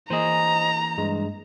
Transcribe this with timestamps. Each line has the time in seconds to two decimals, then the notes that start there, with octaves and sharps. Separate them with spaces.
0.10 E3 A#3 G#4 C5 D#5 A#5
0.98 G2 G#3